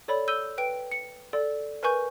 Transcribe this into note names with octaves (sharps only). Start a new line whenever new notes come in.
A4 C#5 D5 B5
E6 G6 D#7 G7
B4 G5 D7
C#7
A4 D5
A#4 B4 G#5 C#6 G6